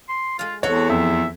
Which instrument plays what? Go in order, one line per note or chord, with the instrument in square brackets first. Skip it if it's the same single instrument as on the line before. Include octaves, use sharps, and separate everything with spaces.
[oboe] C6
[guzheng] G#3 F5 [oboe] F4
[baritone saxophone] E2 [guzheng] C4 A4 [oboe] F#4 [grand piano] C#5
[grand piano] F2 [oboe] E5